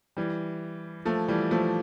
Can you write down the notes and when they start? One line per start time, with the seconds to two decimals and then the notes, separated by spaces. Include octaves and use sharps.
0.17 E3 G3
1.06 F3 A3
1.28 E3 G3
1.51 F3 A3